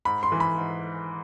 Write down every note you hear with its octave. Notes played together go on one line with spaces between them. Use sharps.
G#2 B5
C6
E3
B5
G#2